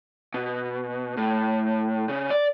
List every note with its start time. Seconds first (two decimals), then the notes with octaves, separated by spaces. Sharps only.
0.34 B2
1.17 A2
2.09 C#3
2.30 D5